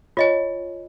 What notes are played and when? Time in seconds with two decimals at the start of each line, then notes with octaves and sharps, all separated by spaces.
0.17 F4 C#5 D#5 G#5